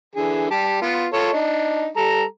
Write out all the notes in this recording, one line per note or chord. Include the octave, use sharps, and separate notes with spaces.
D3 E3 G#4
G3 G4 A5
B3 F4
F4 A4 C#5
D4 D#4
G3 A4 A#5